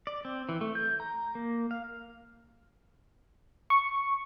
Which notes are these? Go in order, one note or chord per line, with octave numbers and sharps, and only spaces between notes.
D5
C4
E3
A3
G6
A#5
A#3
F5
C#6